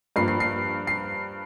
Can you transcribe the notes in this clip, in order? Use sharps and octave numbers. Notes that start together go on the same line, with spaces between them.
G2 F3 A#3 C7
C7
C7
C7